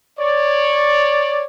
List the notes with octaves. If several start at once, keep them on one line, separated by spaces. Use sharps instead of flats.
C#5 D5